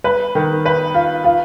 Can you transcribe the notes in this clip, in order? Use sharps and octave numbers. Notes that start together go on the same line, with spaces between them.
B4
D#3
B4
F4
F4